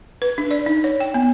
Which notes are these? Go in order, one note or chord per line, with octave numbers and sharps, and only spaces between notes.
B4
D4
D5
D#4
C#5
G5
B3